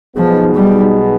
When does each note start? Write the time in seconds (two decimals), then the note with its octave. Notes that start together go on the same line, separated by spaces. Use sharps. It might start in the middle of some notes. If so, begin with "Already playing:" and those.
0.16 B1 B2 F3 B3 D#4 G#4
0.54 G3